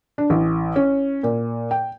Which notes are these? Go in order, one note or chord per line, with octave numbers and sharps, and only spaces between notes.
D4
A1
C#4
A#2
G5